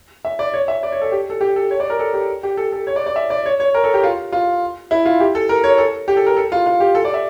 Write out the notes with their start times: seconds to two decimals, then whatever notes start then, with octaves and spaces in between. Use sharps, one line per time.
0.25 E5
0.39 D5
0.54 C#5
0.68 E5
0.83 D5
0.92 C#5
1.01 A4
1.12 G4
1.30 A4
1.41 G4
1.56 A4
1.71 C#5
1.80 D5
1.90 A#4
1.99 A4
2.14 G4
2.43 G4
2.57 A4
2.72 A4
2.87 C#5
2.96 D5
3.06 D5
3.16 E5
3.30 D5
3.46 C#5
3.60 C#5
3.75 A#4
3.84 A4
3.94 G4
4.03 F4
4.32 F4
4.91 E4
5.05 F4
5.20 G4
5.35 A4
5.49 A#4
5.64 C#5
5.78 A4
6.08 G4
6.17 A4
6.26 A#4
6.37 A4
6.52 F4
6.66 F4
6.80 G4
6.95 A4
7.05 D5
7.14 E5